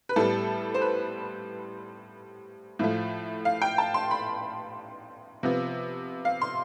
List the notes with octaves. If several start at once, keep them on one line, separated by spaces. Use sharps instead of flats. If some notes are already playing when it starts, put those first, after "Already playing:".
B4
A2 G3 B3 A4
C5
B4
A2 F3 A3
F5
G5
A5
C6
B5
C3 F3 B3
F5
C6